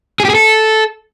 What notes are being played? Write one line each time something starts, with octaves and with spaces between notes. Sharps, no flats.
G#4
G4
G#4
A4